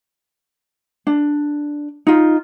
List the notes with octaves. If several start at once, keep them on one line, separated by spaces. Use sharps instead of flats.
D4
D#4 F4